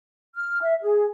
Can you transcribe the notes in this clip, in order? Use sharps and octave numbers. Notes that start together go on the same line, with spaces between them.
F6
E5
G#4